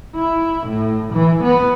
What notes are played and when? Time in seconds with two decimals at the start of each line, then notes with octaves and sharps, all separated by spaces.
0.15 E4
0.67 A2
1.13 E3
1.44 B3